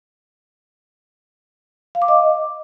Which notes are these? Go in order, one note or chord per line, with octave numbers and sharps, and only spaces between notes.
F5
D6
D#5